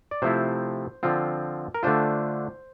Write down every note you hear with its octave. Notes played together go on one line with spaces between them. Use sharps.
D5
C3 F3 A3 C4 E4 C5
D3 F3 C4 F4
A#4
D3 A3 D4 F4 C5